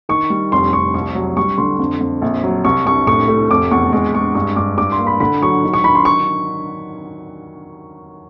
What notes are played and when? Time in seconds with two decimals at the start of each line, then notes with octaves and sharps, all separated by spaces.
0.09 D#3 C#6
0.30 G3
0.52 F1 C6
0.73 F1 C#6
0.94 C2 C#6
1.15 F#3
1.37 G3 C#6
1.58 D3 C6
1.79 F2
2.01 F2
2.22 A#1
2.44 F#3
2.64 C2 C#6
2.85 C2 C#6
3.07 A2 C#6
3.28 A3
3.50 F1 D6
3.71 E2 C#6
3.92 G#3 C#6
4.14 G#3 C#6
4.35 G2 C#6
4.56 G2 D6
4.78 G2 D6
4.92 C6
4.99 A#3
5.07 B5
5.20 D3 B5
5.42 F#3 C#6
5.64 D#3
5.73 C#6
5.84 D#3 B5
5.95 C6
6.05 C#6